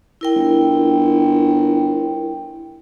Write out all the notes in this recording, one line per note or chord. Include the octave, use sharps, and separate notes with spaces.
E4 A#4 G5
G1